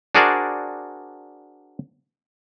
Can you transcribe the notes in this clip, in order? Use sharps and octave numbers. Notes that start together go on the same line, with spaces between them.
D4 F#4 G#4 A#4 C5 D5